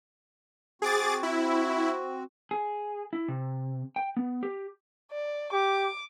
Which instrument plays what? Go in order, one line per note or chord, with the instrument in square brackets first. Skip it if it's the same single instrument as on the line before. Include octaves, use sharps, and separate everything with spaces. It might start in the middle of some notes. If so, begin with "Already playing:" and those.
[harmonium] C4 F#4 [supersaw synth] G#4 D6 A6
[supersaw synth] E4
[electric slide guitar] G#4
E4
C3
G5
B3
G4
[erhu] D5
[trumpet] G4 [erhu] D6